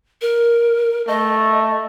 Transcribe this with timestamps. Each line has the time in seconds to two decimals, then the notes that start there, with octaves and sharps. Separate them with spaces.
0.22 A#4
1.08 A3 D#5